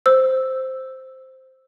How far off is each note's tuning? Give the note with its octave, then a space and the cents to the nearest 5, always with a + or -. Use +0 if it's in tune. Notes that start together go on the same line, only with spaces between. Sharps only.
C5 +0 E6 +0